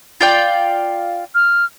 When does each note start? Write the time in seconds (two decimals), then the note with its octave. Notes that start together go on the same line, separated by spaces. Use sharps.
0.21 F4 D5 G5
1.35 F6